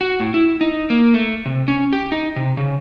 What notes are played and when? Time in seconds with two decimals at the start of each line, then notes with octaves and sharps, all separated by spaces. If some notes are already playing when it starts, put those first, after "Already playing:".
0.01 F#4
0.20 A2
0.34 E4
0.61 D#4
0.90 A#3
1.14 A3
1.46 C3
1.68 C#4
1.93 G4
2.12 D#4
2.36 C3
2.57 C#3